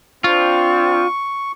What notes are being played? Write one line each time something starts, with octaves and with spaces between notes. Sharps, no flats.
C4 D4 F4 C#6